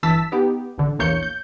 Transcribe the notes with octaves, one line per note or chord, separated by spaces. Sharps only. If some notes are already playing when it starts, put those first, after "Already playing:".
G1 E3 A5 E6 B6
B3 D#4 G4
A1 D3
A#1 E2 A#3 C#5 G6 C#7
G6